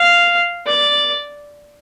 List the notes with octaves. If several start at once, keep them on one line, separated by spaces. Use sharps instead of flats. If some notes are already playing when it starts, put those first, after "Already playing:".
Already playing: F5
D5